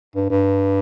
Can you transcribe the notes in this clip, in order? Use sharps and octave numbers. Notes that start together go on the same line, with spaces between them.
G2
G2